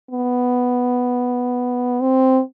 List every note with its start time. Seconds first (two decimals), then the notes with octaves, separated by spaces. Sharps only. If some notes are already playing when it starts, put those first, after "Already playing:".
0.11 B3
2.01 C4